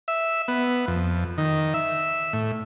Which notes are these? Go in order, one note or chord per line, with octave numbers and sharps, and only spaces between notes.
E5
B3
F2
D#3
E5
A2